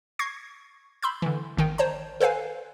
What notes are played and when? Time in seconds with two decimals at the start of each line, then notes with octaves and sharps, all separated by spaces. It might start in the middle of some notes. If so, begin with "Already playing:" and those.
0.19 C#6 G#6 A#6 C7
1.02 B5 C6 E6 G6
1.22 D3 E3
1.57 G#1 D#3 G5
1.78 C5 C#5 A5 A#5
2.20 A4 B4 C5 F5 G#5